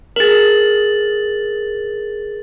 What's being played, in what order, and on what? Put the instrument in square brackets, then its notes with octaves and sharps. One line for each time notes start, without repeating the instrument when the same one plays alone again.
[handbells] G#4 A#4 [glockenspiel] A6 F#7